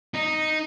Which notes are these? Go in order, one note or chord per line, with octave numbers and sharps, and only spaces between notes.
D#4